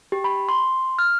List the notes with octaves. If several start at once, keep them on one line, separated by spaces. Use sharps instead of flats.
G4
B5
C6
F6